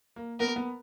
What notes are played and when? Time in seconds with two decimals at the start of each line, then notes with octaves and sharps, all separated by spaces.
0.16 A#3
0.39 B3 A#4
0.56 B3